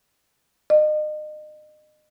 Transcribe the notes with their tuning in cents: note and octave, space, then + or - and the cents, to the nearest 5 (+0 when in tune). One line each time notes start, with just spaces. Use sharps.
D#5 -35